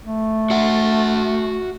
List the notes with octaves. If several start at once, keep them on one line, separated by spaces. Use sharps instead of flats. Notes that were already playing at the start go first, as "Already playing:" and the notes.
A3
F#4 E5 F#5